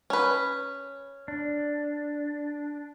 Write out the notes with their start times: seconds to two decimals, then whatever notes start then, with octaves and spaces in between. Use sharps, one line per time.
0.10 C#4 B4
1.28 D4